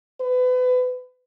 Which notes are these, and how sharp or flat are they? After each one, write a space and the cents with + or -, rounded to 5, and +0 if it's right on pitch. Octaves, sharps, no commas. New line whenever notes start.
B4 +30